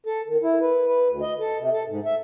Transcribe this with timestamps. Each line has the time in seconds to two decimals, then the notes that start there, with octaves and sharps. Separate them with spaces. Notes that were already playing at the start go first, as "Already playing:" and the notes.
0.06 A4
0.27 D#3
0.43 E4
0.61 B4
0.87 B4
1.09 D2
1.22 D#5
1.40 A4
1.59 C3
1.73 A4
1.88 G#2
2.06 E5